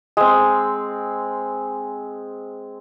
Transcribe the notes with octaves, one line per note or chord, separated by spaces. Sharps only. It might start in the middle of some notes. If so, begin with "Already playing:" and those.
G#3 C4